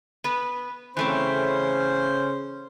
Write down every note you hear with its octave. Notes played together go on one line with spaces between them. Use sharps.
B3 B4
C#3 E3 A3 C4 C#4 C5